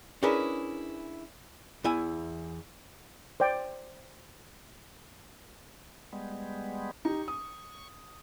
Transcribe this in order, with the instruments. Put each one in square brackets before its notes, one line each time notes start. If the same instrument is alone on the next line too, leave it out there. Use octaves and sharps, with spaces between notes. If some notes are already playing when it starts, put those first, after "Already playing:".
[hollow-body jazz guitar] C#4 D4 E4 G#4 A#4 B4
E2 E4 G#5
[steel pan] C5 D5 G5
[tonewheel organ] G3 G#3 B3
[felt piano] D#4 G4 [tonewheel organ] C#6
[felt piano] D#6